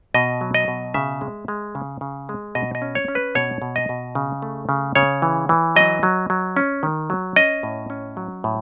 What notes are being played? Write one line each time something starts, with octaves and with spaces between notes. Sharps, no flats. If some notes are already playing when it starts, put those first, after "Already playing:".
B2 D#5
F#3
D#5
B2
C#3 E5
G#3
G#3
C#3
C#3
G#3
B2 D#5
D#5
C#4
C#5
C#4
B4
B2 C#5
B2
D#5
B2
C#3
A3
C#3
C#3 C#5
E3
E3
F#3 D#5
F#3
F#3
C#4
D#3
F#3
C#4 D#5
A2
C#4
F#3
A2